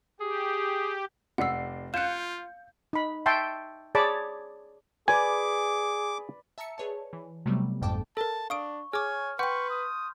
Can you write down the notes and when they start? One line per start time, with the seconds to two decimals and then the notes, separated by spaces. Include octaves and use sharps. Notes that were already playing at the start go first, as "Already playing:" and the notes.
0.20 G4 G#4
1.38 F1 D5 F#5 E6 C7
1.94 F4 F5 F#6 G6 C#7 E7
2.93 D#4 B5
3.26 E5 G5 A5 C6 C#6
3.95 G#4 C#5 D5 A5 B5 D6
5.08 G#4 B4 D5 G#5 D6
6.58 E5 A5 A#5 E6 C#7
6.78 G#4 B4 C#5 D5 A5
7.13 E3
7.46 C3 F#3 G3 A3 B3
7.82 G1 F2 G#2 G5 A5 D6
8.17 A4 A#4 A5
8.50 D4 F5 C#6 D#6 D7
8.93 G#4 C#5 G#5 D6 F6
9.39 B4 F#5 G5 C6 C#6 G6
9.70 D#6